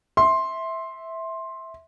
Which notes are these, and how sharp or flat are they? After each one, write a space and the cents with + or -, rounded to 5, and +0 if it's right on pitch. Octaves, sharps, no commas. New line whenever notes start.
E5 -10 C6 +10